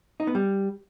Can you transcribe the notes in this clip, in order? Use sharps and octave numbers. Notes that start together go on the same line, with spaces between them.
D#4
B3
G3